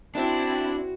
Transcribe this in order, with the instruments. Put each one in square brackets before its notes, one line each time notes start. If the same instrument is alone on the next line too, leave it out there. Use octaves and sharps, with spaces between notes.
[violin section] C4 E4 [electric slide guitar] D4 [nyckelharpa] F#4